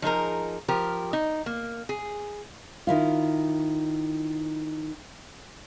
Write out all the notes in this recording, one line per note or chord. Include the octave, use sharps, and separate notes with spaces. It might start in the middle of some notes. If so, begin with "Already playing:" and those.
F3 D#4 G#4 A#4
F3 G4 A#4
D#4
A#3
G#4
D#3 E4 F4